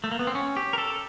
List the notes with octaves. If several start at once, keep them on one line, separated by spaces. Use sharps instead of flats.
A3
A#3
B3
C4
C#4
G4
A#4
A4